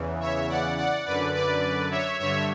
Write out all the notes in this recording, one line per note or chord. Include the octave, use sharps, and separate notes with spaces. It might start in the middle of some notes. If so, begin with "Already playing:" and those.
Already playing: E2 C#3 E3
C#5 E5
D5 F#5
D5 F#5
F#2 D3 B4 D5
B4 D5
C#5 E5
G2 D3 C#5 E5